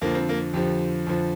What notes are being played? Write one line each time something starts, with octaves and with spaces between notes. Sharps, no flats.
F2 D3 F3 A#3
C4
A#3
F2 D3 F3 G4
F2 D3 F3